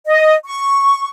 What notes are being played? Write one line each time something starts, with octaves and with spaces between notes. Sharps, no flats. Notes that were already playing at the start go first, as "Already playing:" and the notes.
D#5
C#6